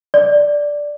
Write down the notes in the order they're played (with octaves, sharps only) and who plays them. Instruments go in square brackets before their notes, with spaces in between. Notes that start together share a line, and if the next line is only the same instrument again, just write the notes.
[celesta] D5